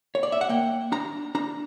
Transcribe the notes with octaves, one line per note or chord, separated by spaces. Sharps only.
C#5
D5
E5
F#5
A#3 G5
D4 A#5
D4 A#5